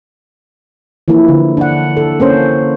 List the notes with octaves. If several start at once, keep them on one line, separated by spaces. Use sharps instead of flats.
E3 F3 A#3 E4
D3
D4 F#5
A4
A#3 C#4 C5